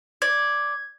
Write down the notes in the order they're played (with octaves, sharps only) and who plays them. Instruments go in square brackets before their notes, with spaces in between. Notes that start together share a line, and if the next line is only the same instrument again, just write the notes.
[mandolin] D5 [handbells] G#6